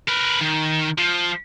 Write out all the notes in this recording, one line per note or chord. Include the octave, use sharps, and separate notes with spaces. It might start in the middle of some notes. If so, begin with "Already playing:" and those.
A#4 B4
D#3
F3